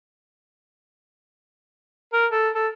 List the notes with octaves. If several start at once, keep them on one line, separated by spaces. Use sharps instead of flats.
A#4
A4
A4